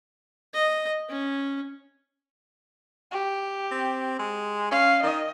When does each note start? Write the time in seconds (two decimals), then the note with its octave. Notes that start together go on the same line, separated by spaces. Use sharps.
0.54 D#5
1.09 C#4
3.11 G4
3.71 C4
4.19 G#3
4.71 C#4 F5
5.03 D#3 D#5